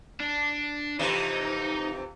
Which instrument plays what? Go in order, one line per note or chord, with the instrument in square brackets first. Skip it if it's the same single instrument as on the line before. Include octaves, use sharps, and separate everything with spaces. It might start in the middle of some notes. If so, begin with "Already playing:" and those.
[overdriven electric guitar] D4
[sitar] F2 C3 E3 [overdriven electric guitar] D#4